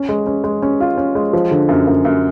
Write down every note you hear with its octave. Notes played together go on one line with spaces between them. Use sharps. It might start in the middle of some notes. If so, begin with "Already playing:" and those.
Already playing: C#4
G#3
C#4
G#3
C#4
F4
C#4
G#3
F3
D3
F#2
F#2
F#2